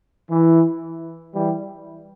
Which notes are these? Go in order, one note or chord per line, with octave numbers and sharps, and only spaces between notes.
E3
E3 G3